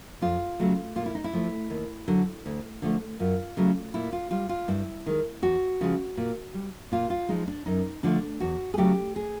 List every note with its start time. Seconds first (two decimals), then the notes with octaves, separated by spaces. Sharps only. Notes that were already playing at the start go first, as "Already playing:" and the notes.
0.21 F2 F4
0.60 C#3 F#3 A3
0.96 A#2 F4
1.06 E4
1.15 D#4
1.24 E4
1.33 F3 A3
1.70 D#2
2.08 D3 F#3
2.46 D2
2.82 D3 F3 A3
3.20 F#2 F4
3.57 C#3 F#3 A3
3.94 A#2 E4
4.13 F4
4.31 G3 F4
4.49 F4
4.68 G2 E4
5.06 D#3 G#3
5.42 E2 F#4
5.81 C#3 F3 G#3
6.17 A#2
6.54 G3
6.92 A#2 F4
7.10 F4
7.29 F3 G#3 D#4
7.48 D4
7.66 F#2 D#4
8.03 D3 F3 A3 D4
8.40 E2 F#4
8.74 G#4
8.77 C#3 F#3 A3 G4
9.16 G#4